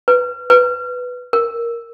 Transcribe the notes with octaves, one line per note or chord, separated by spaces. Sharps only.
B4
B4
A#4